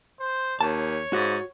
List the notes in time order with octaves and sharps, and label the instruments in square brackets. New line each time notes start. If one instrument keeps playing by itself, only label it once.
[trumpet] C5
[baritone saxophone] D#2 [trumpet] C#5 [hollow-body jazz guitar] A5
[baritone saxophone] G#2 [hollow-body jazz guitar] F#4